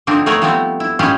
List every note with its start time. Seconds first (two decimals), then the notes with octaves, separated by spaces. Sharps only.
0.07 D3 F3 A#3 C4 D4 D#4
0.26 A3 B3 G#4 A#4 B4 C#5
0.42 F3 G3 A3 B3 C4
0.80 E4
0.99 A#2 G3 G#3 C#4 F4 G4